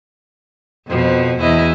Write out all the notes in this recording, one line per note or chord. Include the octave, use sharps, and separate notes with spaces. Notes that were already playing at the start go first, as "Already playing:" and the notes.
F2 B2 F3
E2 E4 D#5